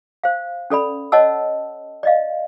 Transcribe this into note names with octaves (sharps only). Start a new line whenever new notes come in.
C5 F5
C#4 A4 D5 B5
C#5 D#5 F#5 A5 E6
D5 D#5 F5